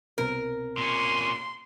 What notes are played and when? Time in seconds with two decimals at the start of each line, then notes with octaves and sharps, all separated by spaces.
0.18 C2 B2 C4 A#4
0.78 A#2 C#4 C6